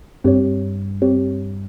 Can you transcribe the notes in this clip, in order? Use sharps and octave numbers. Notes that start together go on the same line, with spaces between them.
G2 C4 G4 C#5
C4 G4 C#5